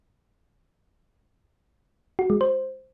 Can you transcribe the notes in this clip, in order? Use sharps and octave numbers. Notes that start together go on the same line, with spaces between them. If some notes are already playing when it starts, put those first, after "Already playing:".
F#4
G#3
C5